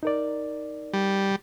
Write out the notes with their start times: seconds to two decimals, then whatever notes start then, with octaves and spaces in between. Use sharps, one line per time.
0.03 D#4 A#4 D5
0.93 G3